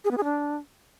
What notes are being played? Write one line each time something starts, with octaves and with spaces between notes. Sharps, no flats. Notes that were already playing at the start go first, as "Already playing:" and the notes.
G#4
B3
G#4
D4